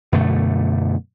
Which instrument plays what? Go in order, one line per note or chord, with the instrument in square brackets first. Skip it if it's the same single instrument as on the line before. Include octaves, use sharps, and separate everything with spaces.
[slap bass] F#2 B2 D3 A3